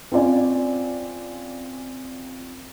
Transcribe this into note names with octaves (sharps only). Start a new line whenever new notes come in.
C4 C#4 F4 D5 G#5